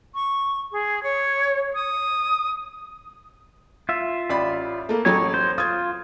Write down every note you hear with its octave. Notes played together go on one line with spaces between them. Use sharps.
C#6
G#4
C#5
D#6
F4 E5
A1 D5 B5
A3 A#3
A1 F#3 A4 C#5
C5
F4 D#6 G#6